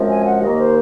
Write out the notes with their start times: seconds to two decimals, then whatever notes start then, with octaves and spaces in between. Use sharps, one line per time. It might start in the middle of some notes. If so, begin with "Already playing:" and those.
Already playing: F#2 F3 G#3 C4
0.09 G#5
0.25 F#5
0.41 D#2 D#3 A#3 D#5
0.57 C5